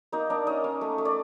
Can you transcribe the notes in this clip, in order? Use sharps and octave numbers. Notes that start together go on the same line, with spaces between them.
A#3 D#4 D#5
A#3 D4 D5
C#4 D#4 D#5
A#3
A3
A3
D5